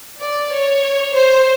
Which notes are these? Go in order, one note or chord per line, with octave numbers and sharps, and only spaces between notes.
D5
C#5
C5